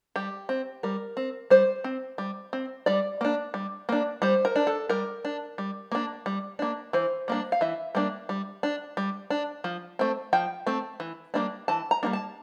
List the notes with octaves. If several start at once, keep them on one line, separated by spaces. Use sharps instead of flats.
G3 G4
C4
G3 A#4
C4
G3 C5
C4
G3
C4
G3 D5
A#3 D4
G3
A#3 D4
G3 C5
A#4
D4
A4
G3 A#4
D4
G3
A#3 D4
G3
A#3 D4
E3 C5
G3 A#3 D4
F5
E3 E5
G3 A#3 D4
G3
D4
G3
D4
F3
A3 C4
F3 G5
A3 C4
E3
G3 A#3 D4
E3 A5
A#5
G3 A#3 D4
A5